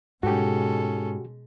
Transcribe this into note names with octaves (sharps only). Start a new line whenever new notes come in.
G#2 B2 G#3 C#4 F#4 G4 A4